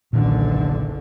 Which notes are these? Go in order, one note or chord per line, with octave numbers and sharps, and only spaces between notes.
F#1 B1 A#2 D3 D#3